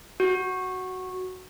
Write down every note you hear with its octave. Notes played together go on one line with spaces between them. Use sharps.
F#4